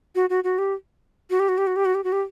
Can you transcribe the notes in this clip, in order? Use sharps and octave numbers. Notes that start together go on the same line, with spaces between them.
F#4
F#4
F#4
G4
F#4
G4
F#4
G4
F#4
G4
F#4
G4
F#4
G4